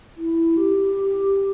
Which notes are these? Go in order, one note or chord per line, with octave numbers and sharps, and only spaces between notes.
E4
G4